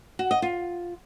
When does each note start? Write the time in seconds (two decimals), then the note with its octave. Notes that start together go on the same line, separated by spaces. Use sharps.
0.19 F#4
0.31 D#5
0.42 F4